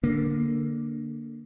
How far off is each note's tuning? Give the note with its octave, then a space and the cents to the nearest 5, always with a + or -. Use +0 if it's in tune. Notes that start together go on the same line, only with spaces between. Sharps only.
D3 +0 A#3 +0